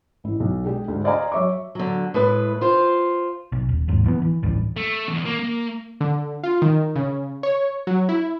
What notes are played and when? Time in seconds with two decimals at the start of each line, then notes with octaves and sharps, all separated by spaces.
0.24 A1 E4
0.40 B1
0.64 G#3 D4 G4 G#4
0.88 D2 G#2 D3
1.04 C5 D5 D#5 F5 G#5 A#5
1.32 F#3 C#5 E5 C#6 D6
1.75 D3 F#3
2.14 A2 G#3 B4
2.61 F4 C5
3.52 B1
3.69 D#1
3.88 F1 D#2 G#2
4.04 D1 E3 A3 B3
4.22 E3
4.43 A1 D2 G2 E3
4.76 A3
5.08 E2
5.25 A#3
5.39 A#3
6.01 D3
6.44 F4
6.62 D#3
6.96 C#3
7.43 C#5
7.87 F#3
8.09 E4